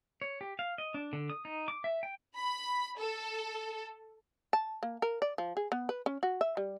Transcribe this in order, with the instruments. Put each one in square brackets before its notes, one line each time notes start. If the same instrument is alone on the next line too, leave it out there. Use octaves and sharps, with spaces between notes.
[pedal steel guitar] C#5
G4
F5
D#5
D4
D3
D#6
D#4
D6
E5
G5
[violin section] B5
A4
[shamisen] A5
A#3
A#4
D5
F3
G#4
B3
B4
C#4
F#4
E5
G3